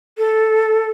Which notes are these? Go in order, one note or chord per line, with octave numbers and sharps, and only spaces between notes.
A4